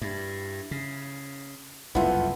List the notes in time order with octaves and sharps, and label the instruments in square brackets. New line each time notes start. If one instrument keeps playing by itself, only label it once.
[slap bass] G2 [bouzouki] E4
[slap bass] C#3
[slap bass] F#1 C2 F2 [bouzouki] A3 B3 [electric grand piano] E4 F4 B4